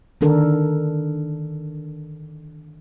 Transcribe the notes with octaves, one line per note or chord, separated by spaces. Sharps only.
D3 D#3 D4 A4 A#4